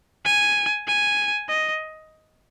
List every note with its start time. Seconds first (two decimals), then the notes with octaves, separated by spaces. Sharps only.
0.25 G#5
0.87 G#5
1.49 D#5